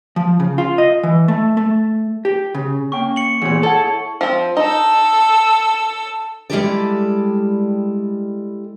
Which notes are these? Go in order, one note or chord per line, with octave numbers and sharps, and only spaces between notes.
F3
C#3
F4
D#5
E3
A3
A3
G4
C#3
A#3 C#4 G5 C#6
C#7 F#7
E2 A#2 G4 C5 C#5
G#4 A4 D5 F#5
E4
F3 C4
D#4 A4 E6
G3 G#3 E4 G4 A4 D5